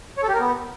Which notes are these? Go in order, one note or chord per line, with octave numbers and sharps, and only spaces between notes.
C#5
A4
G4
A#4
B3